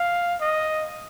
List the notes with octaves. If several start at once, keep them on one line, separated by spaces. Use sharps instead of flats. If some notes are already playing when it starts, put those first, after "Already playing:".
Already playing: F5
D#5